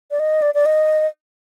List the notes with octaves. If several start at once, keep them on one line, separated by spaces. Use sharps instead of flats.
D5
D#5
D5
D5
D#5